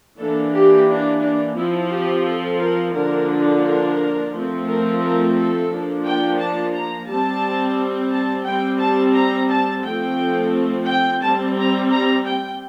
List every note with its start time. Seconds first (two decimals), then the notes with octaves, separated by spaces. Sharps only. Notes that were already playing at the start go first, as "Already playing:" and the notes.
0.19 E3 A#3 D4 A4
0.53 G4
0.88 D4
1.23 D4
1.57 F3 C4 E4
1.91 G4
2.26 A4
2.61 A#4
2.95 D3 F3 A#3 D4 A#4
3.64 A#4
4.33 F3 A3 C4
4.67 A#4
5.02 A#4
5.36 A4
5.70 F3 A#3 D4
6.05 G5
6.39 A5
6.74 A#5
7.08 G3 C4 A5
8.12 A5
8.46 G3 C4 G5
8.80 A5
9.15 A#5
9.50 A5
9.84 F3 A3 C4 G5
10.87 G5
11.22 G3 C4 A5
11.57 A#5
11.91 A#5
12.25 G5